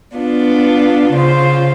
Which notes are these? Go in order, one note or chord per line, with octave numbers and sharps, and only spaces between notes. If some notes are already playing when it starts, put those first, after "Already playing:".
B3 D4 F4
C#3 F4 C5